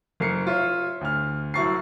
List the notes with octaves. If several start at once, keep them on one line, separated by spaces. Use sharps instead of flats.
F#1 A#4 C7 C#7
F4 C#5 E5
D2 F6
C2 F#3 E4 C#6 A6 C7